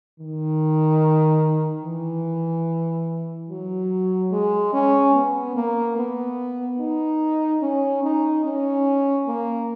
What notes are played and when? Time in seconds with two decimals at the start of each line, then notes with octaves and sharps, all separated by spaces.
0.20 D#3
1.85 E3
3.49 F#3
4.31 G#3
4.73 C#4
5.14 B3
5.55 A#3
5.97 B3
6.79 D#4
7.62 C#4
8.03 D#4
8.44 C#4
9.27 A#3